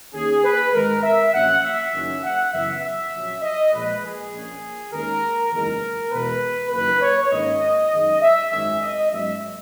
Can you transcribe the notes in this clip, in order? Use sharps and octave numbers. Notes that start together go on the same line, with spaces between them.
D#2 D#3 A#3 C#4 G#4
B4
G#1 G#2 D#3 G#3 A#4
E5
A#1 A#2 F#3 C#4 F#5
E5
F#1 F#2 D#3 F#3 C#4
F#5
F#2 C#3 E3 B3 E5
E5
A#1 A#2 F#3 C#4
D#5
A#1 A#2 G#3 B4
G#4
A#1 A#2 A#3 C#4
D#2 D#3 G#3 C#4 A#4
F#1 E2 D#3 G#3 B3 A#4
E2 B2 G#3 B3 B4
F#1 F#2 D#3 A#3 B4
C#5
G#1 G#2 D#3 A#3 C#4 D#5
F#2 D#3 G#3
E5
G#1 F#2 D#3 G#3 C#4 E5
D#5
G#2 F#3 A#3 C#4 E5